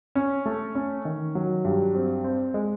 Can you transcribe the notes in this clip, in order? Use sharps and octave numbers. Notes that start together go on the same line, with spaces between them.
C#4
A3
C#4
D#3
F#3
G2
C4
C4
G#3